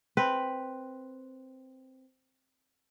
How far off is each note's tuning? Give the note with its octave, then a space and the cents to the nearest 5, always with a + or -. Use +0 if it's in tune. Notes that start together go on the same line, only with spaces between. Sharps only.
C4 +0 B4 +0